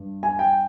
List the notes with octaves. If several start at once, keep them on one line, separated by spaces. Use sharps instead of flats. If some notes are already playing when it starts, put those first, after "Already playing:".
Already playing: G2
G#5
G5